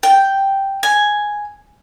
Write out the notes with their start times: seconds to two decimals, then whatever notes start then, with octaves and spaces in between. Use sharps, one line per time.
0.03 G5
0.83 G#5